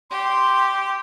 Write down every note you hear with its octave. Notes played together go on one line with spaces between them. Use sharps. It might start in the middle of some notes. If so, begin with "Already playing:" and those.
G4 C6